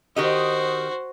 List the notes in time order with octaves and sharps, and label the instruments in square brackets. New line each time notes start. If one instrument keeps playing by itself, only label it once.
[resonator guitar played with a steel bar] D#3 G4 D#5 [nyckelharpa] F#4 C5